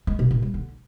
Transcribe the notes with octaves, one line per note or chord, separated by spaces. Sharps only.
G#3
B2
A#2
G3
D3